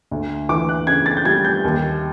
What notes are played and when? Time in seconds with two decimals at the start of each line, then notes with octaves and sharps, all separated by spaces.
0.11 D2
0.49 E3 D6
0.69 F#6
0.87 C#3 G#6
1.06 A6
1.17 G6
1.25 G3 G#6
1.45 G6
1.64 D#2